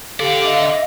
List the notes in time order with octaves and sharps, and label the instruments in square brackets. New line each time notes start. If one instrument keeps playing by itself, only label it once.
[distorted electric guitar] D3 D5 [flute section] G4 [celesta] A4 D7 [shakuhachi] F5
[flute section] D#5 E5